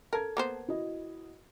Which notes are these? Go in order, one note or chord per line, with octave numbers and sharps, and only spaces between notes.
A4 A#4 A5 G#6
A#3 B3 C5
E4 F#4 D#5